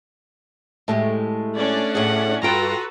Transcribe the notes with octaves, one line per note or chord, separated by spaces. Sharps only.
A2 G#3 A3 G4
C#4 D4 D5
A2 G#4 F#5
G2 F4 F#4 A4 B4 G5 A#5 C6